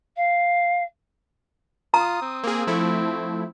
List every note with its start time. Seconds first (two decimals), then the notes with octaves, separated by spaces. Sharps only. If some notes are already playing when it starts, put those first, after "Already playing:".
0.17 F5
1.94 F4 A#5 D#6
2.22 C4
2.44 A#3 G#4
2.67 F3 A3 E4